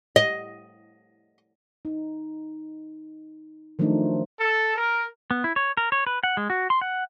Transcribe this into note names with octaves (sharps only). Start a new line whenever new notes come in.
D#5
D#4
D#3 F3 F#3 A3 D4 D#4
A4
A#4
B3
E4
C#5
A#4
C#5
B4
F#5
G#3
F#4
C6
F#5